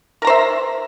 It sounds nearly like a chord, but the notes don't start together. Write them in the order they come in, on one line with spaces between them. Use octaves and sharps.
A#4 A#5 C5 E5